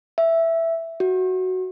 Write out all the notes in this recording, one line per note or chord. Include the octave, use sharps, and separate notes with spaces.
E5
F#4